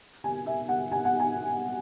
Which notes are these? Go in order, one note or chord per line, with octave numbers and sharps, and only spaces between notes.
G#5
E5
F#5
G#5
F#5
G#5